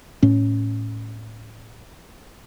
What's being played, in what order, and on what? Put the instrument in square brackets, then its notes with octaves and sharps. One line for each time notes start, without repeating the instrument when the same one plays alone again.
[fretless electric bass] A2 C#4